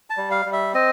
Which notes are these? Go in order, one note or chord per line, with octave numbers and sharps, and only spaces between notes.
A5
G3
F5
G3
E5
C4 D#5